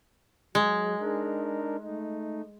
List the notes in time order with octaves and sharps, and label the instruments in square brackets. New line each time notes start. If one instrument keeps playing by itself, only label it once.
[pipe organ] F#3 [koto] G#3
[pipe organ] D4 D#4 A#4
A3 D#4